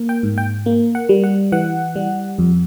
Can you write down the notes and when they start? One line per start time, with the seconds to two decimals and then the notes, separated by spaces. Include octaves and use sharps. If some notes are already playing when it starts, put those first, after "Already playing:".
Already playing: A#3
0.09 G5
0.23 G#2
0.38 G5
0.66 A#3
0.95 F#5
1.09 G3
1.24 F#5
1.52 E3 F#5
1.96 G3
2.39 F2